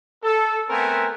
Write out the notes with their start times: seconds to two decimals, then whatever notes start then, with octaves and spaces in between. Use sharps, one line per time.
0.23 A4
0.70 A3 B3 C4 A#4 G#5